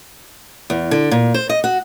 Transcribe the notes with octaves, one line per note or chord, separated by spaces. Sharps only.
E2
D3
A#2
C5
D#5
F#4